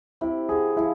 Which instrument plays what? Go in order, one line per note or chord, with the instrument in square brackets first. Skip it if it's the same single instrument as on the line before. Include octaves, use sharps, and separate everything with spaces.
[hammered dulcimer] C3 [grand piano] E4
[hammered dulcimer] D3 [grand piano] G#4
[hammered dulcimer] F3 [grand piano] E4